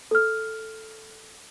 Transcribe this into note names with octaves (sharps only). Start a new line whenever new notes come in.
A4 F6